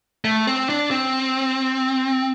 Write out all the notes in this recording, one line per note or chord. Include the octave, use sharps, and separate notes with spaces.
A3
C4
D4
C4